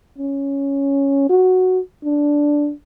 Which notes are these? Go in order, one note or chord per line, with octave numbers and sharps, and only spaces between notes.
C#4
F#4
D4